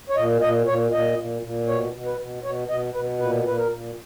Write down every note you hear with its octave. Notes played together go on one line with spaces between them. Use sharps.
C#5
A#2 D#5
A#2 D#5
A#2 C#5
A#2 D#5
A#2
A#2
B2 C#5
B2
B4
B2
B2 C#5
B2 D#5
B2 B4
A#2 B4
A#2 B4
A#4
A#2